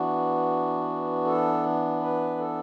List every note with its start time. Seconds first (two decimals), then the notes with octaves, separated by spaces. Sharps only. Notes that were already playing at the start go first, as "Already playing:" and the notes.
Already playing: E3 B3 D4 F#4
1.25 A4
2.00 B4
2.38 A4